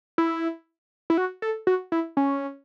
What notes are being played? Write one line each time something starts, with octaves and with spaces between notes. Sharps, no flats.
E4
E4
F#4
A4
F#4
E4
C#4